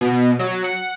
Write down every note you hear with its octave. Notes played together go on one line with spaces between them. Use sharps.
B2
F#3
F#5